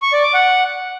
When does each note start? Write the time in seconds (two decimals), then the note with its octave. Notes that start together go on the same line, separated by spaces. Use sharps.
0.02 C#6
0.13 D5
0.23 D6
0.34 F#5